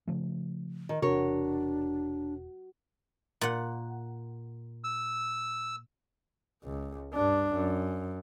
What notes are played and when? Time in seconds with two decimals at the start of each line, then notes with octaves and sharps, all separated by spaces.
0.07 C#3 F3 A3
0.89 D#3
1.02 E1 C3 D4 F#4 A#4 C#5
3.41 A#2 F#5
4.84 E6
6.64 C#2
7.14 G2 D4
7.54 F#2